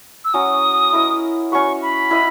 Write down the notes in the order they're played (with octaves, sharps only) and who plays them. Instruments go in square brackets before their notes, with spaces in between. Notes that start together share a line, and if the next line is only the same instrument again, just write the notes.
[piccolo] E6
[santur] F#3 C#4 F#4 [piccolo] D#6
[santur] E4 A#4 D#5
[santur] C#4 F#4 B4 [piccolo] C#6
[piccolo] B5
[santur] E4 B4 D#5